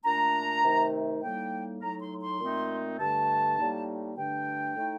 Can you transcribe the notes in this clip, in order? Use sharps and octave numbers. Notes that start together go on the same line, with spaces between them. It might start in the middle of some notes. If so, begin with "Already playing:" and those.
A#2 A3 D4 A#5
C3 D#3 A3 D#4
A2 G3 A#3 D#4 G5
A2 F#3 A3 D#4 A#5
C6
C6
A#2 A3 C4 D#4
G2 D3 A3 A5
A2 G3 A#3 D#4
G2 D3 A3 D4 G5
A2 A3 D#4